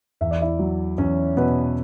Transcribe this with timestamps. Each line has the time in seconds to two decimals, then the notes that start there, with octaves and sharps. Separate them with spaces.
0.21 E2 E5
0.31 D5
0.41 E4 E5
0.59 F#3
0.98 E2 C#4 C#5
1.37 B2 B3 B4